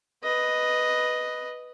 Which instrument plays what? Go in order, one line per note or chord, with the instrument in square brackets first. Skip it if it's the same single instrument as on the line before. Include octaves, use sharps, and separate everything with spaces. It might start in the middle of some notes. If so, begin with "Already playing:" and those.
[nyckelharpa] B4 D#5